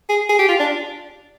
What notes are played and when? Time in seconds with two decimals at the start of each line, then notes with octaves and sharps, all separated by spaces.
0.09 G#4
0.29 G#4
0.39 G4
0.49 F4
0.60 D4